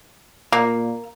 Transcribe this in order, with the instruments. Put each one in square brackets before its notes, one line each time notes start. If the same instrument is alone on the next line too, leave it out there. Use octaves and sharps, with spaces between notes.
[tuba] A#2 [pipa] A#3